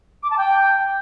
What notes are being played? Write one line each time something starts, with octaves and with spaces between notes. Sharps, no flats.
D6
A5
G5